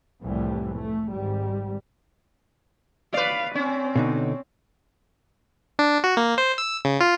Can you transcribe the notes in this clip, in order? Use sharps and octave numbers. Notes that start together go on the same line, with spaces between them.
C2 F2 A2 E3 G3
A3
G#1 G#2 G3
B4 D5 F5
C4 C#4
B2 D3 D#4
D4
F#4
A#3
C5
E6
C#3
F4